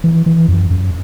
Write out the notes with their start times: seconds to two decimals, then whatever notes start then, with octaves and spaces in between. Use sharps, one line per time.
0.04 E3
0.26 E3
0.48 F#2
0.70 F#2